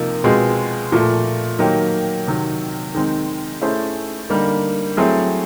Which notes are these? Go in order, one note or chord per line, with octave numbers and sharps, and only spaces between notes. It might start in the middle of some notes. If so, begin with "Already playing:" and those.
Already playing: C3 F3 A#3 D#4
B2 G#3 C4 F4 G#4
A#2 F3 A3
D#3 F#3 A#3 D#4 G4
C3 D#3 F#3
D#3 G#3 C4 D#4
A3 C#4 E4 G#4 C5
D3 G3 A#3 D#4
F#3 A3 C4 E4 G#4